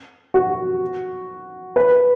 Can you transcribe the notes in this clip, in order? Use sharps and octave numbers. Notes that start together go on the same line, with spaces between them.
F#4
B4